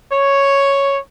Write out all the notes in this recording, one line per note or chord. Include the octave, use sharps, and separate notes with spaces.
C#5